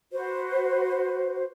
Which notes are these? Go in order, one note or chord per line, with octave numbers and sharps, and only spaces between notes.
F#4 B4 C5